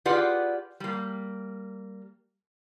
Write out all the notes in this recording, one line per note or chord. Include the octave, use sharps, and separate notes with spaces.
F4 G4 G#4 B4 D5 F#5
G3 A#3